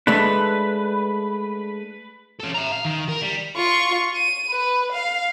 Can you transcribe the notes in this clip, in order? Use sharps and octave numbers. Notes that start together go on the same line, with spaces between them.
G#3 A3 D4 B4
C#4 A4
E5 A#5
F5
D#3
A#4
G3
F4 C#6
D#7
B4
F5